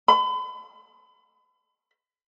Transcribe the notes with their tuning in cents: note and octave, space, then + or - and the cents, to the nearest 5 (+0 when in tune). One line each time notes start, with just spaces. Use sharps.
B5 +40